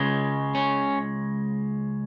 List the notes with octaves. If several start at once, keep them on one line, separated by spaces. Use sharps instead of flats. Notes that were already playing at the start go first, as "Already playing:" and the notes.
Already playing: C#2 C#3 G#3
C#4